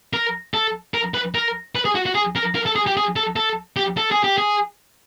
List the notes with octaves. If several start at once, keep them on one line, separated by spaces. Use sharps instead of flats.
A#4
A4
A#4
B4
A#4
B4
G#4
F#4
F#4
G#4
A#4
A#4
A4
G#4
G4
G#4
A4
A4
G4
A4
G#4
G4
G#4